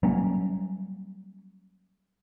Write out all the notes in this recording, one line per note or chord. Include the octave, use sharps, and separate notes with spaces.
F#3 G3 A#3 C#4